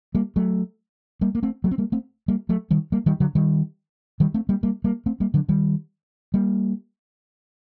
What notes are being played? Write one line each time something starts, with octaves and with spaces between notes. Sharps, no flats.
G3 A#3
F#3 A3
G3 A#3
A#3
A3 C4
F#3 A3
C4
G3 A#3
A3 C4
G3 A#3
F#3 A3
D#3 G3
G3 A#3
D#3 G3
D3 F#3
D#3 G3
D#3 G3
A3 C4
G3 A#3
G3 A#3
G3 A#3
A3 C4
G3 A#3
D3 F#3
D#3 G3
G3 A#3